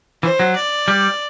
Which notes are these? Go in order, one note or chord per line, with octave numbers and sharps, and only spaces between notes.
E3 C5
F#3
D5
G3